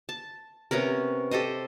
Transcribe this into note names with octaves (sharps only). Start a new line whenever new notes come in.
A5
C3 B3 C#4 A#4
G4 A4 C5 D#5